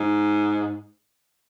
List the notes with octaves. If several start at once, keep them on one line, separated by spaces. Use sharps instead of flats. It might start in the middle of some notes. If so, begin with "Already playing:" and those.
Already playing: G#2